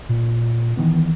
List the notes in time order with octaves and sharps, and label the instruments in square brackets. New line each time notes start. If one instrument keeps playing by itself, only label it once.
[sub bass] A#2
[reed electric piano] D#3 E3 B3